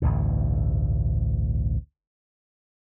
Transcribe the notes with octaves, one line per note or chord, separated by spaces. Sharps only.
A1 D2 G2 B2